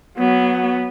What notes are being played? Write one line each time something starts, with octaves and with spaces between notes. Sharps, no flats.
F#3 B3